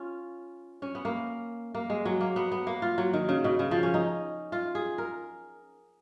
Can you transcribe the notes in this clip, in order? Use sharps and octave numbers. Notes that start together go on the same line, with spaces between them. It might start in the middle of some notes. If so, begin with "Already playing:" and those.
Already playing: C#4 F4
C#4
B3
A#3
A#3
G#3
F#3
A#3
B3
B3
A#3
F4
F#3
D#3
C#3
B2
C#3
F3
C#4
D#4
F4
G#4
A#4